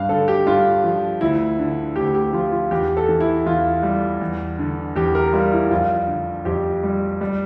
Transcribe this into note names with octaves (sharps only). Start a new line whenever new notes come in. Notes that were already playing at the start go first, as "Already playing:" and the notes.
Already playing: G2 F5
D3 A4
G4
G2 F4
F3
D2 E4
D3
D2 G4
G4
F3 F4
F4
E2 G4
A4
E3
E4
E2 F4
G3
E2
D3
E2 G4
A#4
G3 F4
E4
F2 F4
D3
F2 G4
G3
G3